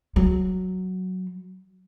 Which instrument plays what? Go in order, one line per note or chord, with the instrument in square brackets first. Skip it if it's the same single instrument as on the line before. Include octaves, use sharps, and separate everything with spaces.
[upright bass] F#3